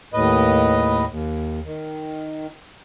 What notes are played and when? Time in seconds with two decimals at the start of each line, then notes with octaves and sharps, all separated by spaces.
0.13 D#2 A2 B4 D#5
1.10 D#2
1.65 D#3